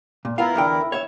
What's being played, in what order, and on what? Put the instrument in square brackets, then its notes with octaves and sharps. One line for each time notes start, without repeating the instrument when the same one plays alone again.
[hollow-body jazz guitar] A#2
[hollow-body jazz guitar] B3 F4 F5 [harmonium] E4 A#4
[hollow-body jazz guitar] E2 D3 G5
C#5 E5